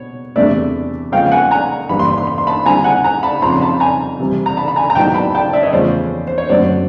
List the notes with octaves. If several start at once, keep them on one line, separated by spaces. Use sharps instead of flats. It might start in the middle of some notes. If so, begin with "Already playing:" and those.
Already playing: B2 C#5
E2 C3 E3 A3 D4 D5 E5
C#3 F3 G#3 B3 F5 G5
F#5 G#5
G#5 A#5
G2 E3 G3 A#3 B5
C6
B5
C6
B5
C6
A5 B5
D3 G3 C4 E4 G#5 A#5
F#5 G#5
G#5 A#5
A5 B5
F2 C#3 F3 A#5 C6
C6
A5 B5
G#5 A#5
C3 E3 G3 C4
A#5
A5 B5
B5
G#5 A#5
A#5
G#2 D#3 F#3 B3 E4 G5 A5
A5 B5
G5 A5
D5 E5
C#5 D#5
E2 C#3 F3 A3 C#4 C5 D5
C5
C#5
F#2 D3 F#3 A3 C4 C5 D5